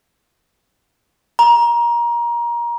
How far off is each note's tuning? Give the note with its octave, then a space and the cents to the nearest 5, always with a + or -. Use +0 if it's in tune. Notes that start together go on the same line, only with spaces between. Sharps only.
A#5 +20